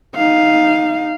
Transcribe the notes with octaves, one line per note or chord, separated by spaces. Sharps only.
D#4 F5